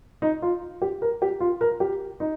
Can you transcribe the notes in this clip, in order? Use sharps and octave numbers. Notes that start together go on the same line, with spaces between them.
D#4
F4
G4
A#4
G4
F4
A#4
G4
D#4